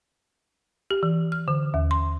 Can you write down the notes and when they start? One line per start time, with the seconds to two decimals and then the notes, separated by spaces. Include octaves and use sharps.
0.91 G4
1.03 E3
1.32 F6
1.48 D3
1.74 D#2
1.91 C6